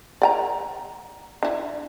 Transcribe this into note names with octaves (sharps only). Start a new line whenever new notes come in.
D5 G5 A#5
D4 E4